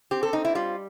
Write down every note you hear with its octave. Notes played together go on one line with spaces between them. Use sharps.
C4 G4
A4
C4 D#4
E4
G3 F4